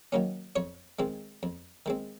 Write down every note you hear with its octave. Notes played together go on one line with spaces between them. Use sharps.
D#3 F#3 A#3 C#4
F2 C#5
D#3 G#3 C4
F2
D#3 G#3 C4